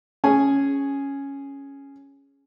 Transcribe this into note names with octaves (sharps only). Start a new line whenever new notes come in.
C#4 G#4 G#5